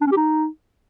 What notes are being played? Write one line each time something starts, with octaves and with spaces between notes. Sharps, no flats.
D4
C#4
G4
D#4